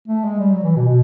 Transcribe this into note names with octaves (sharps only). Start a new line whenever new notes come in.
A3
G#3
G3
F#3
E3
B2
B2